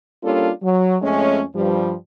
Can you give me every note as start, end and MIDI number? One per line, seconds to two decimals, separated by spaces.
0.24 0.49 55
0.24 0.49 58
0.24 0.49 61
0.24 0.49 62
0.24 0.49 65
0.24 0.49 69
0.63 0.96 54
1.02 1.41 41
1.02 1.41 56
1.02 1.41 57
1.02 1.41 61
1.55 1.93 43
1.55 1.93 53
1.55 1.93 55